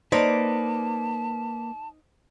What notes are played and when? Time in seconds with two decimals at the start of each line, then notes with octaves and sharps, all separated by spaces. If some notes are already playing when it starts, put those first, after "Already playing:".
0.12 A#3 D#4 B4 C5 D5 A5